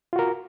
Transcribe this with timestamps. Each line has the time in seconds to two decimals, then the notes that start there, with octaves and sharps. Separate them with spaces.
0.13 F4
0.16 F#4
0.19 A#4